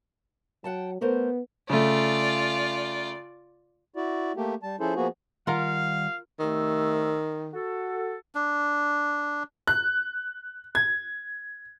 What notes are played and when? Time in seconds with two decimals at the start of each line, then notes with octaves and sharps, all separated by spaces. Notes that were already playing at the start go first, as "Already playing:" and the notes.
0.64 F#3 F#5 G5 A5
1.01 A3 B3 A#4 C5
1.70 C#3 A3 F4 D5
3.96 E4 F#4 D5
4.36 A3 A#3 G4
4.63 G3 A5
4.80 F3 C#4 E4 G#4 A4 C5
4.96 F3 A#3 B3 F#4 G#4
5.47 D#3 G3 F4 A#4 F5 F#5
6.40 C2 D#3 A3 E6
7.54 F#4 A4
8.35 D4
9.67 F#6
10.75 G#6